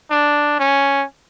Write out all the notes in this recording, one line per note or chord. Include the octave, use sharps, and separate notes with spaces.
D4
C#4